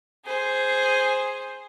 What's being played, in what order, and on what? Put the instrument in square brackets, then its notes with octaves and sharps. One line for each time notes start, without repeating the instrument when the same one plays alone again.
[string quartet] G#4 C5